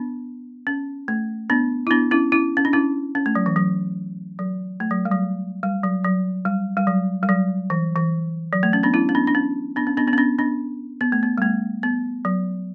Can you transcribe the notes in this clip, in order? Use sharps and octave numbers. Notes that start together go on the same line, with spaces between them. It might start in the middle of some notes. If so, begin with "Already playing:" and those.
Already playing: B3 D4
C#4
A3
B3 D4
E4
B3 D4
C#4 E4
C#4 E4
C#4
D4
C#4 E4
C#4
A3
F#3
E3
F#3
F#3
A3
F#3
G3
F#3
G3
F#3
F#3
G3
G3
F#3
G3
F#3
E3
E3
F#3
A3
C#4
B3 D4
C#4 E4
C#4
B3 D4
D4
C#4
B3 D4
C#4
B3 D4
B3 D4
C#4
B3 D4
B3 D4
B3
A3
B3
G3
A3
B3
F#3